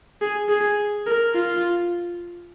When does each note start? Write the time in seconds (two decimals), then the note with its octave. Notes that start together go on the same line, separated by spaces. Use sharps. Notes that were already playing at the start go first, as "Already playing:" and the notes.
0.22 G#4
0.49 G#4
1.07 A#4
1.35 F4